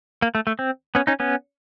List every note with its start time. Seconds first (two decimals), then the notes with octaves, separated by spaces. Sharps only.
0.22 A#3
0.35 A3
0.47 A3
0.59 C4
0.95 B3 C#4
1.07 C#4 D#4
1.20 B3 C#4